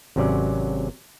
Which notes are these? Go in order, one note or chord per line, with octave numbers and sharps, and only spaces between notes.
G#1 C3 F#3 C#4 D5